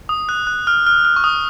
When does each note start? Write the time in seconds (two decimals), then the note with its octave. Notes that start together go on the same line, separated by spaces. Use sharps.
0.09 D#6
0.29 F#6
0.47 F#6
0.67 F6
0.87 F6
1.05 F6
1.16 C#6
1.24 D#6